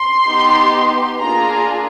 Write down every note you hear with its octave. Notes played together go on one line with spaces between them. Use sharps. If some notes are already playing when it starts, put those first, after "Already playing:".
Already playing: C6
B3 D#4 G4
A#3 D4 F4 G#4 A#5